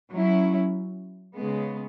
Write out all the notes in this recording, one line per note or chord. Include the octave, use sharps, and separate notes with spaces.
F#3 C#4 E4
C#3 G#3 B3